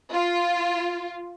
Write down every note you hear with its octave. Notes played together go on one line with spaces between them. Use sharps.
F4